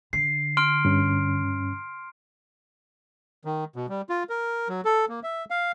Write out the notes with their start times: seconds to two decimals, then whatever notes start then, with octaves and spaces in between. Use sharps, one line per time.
0.13 D3 C7
0.57 C6 F6 D7
0.85 G2 C#4
3.45 D#3
3.76 B2
3.89 G3
4.09 F4
4.29 A#4
4.69 F#3
4.85 A4
5.09 A#3
5.23 E5
5.50 F5